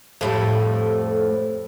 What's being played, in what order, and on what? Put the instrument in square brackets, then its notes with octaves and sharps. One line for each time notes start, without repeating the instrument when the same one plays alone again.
[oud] F2 A2 G3